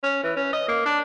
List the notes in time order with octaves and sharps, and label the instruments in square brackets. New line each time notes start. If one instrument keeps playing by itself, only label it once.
[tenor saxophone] C#4
E3
C#4
D#5
A#3
D4